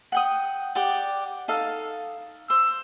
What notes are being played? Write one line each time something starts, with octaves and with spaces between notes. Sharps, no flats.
F#5 G5 D#6
G4 D5 F#5
D#4 A4 F5
C5 E6